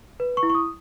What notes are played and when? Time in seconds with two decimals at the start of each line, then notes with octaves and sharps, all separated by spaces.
0.20 B4
0.37 C#6
0.43 E4
0.50 C#6
0.55 D#6